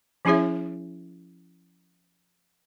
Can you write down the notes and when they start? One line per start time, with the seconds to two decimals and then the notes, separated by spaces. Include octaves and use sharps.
0.25 F3 C#4 E4 G#4 C#5 E5